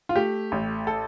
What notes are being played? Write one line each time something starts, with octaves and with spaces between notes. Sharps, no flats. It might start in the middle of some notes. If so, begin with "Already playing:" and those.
F4
A3 G4
A1
A4